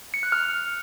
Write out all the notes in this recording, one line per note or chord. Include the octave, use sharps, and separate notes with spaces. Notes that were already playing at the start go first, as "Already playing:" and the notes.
C#7
F#6
F6